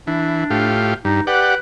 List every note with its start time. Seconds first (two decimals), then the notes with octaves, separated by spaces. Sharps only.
0.07 E3 D4
0.50 A2 F4 G4
1.05 G2 D#4
1.27 G4 B4 D5 F#5